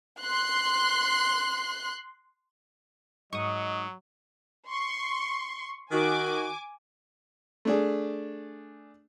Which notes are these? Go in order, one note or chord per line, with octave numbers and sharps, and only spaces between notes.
C6 F#6
G#2 F#3 D#5 C#6 D#6
C6 C#6
D#3 F#4 G#5 D6
A3 D4 G#4